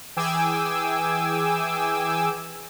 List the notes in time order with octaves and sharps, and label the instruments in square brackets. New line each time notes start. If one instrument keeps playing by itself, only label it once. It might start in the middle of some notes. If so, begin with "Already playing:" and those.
[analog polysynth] E3 G#4 G5 G#5 D6 E6